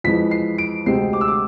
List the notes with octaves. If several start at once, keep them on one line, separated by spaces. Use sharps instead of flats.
F2 E3 G#3 B6
C7
D7
D2 C3 G#3 C4 C7
D6
E6
D6